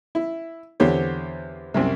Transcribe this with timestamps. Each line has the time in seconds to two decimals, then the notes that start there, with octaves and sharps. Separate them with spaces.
0.15 E4
0.80 E2 D3 C4 G4 C5 C#5
1.74 C2 F#2 C3